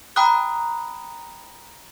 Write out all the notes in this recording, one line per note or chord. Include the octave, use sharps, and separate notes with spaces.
G5 A#5 B5 D#6 F#6